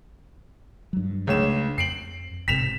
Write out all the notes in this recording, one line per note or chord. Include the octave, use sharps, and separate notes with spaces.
G2 F#3
C#2 C#3 A3 D4 C#5 E7
F2 C7 D7 F#7
E1 G#2 C3 B6 E7 F7